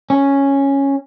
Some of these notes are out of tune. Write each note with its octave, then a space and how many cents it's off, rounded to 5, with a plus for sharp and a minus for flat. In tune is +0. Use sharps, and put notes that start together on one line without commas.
C#4 -5